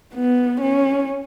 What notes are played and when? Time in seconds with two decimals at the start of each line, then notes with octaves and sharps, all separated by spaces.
0.15 B3
0.60 C#4